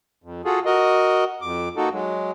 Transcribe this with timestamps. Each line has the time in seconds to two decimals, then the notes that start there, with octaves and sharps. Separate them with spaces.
0.24 F2
0.45 F4 F#4 G#4 A4
0.66 F#4 A#4 D#5
1.42 F2 D6
1.77 A#3 D#4 F#4 A4
1.92 F#3 G#3